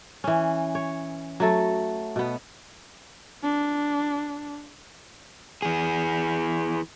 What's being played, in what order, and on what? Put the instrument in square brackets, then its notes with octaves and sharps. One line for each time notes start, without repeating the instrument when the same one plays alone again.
[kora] E3 C#4
C#5
F#3 A3 A4
B2 B3
[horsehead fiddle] D4
[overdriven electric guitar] E3 G#4